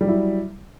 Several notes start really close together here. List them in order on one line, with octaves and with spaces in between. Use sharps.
G3 F#3 E4